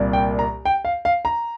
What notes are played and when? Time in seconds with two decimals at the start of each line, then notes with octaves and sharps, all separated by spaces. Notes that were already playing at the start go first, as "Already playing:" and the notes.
Already playing: C2 A#2 G3 A#3
0.13 G5
0.39 A#5
0.65 G5
0.85 F5
1.05 F5
1.25 A#5